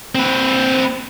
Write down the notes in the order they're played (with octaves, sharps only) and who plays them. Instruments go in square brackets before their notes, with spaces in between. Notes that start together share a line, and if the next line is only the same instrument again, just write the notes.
[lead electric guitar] C4 B4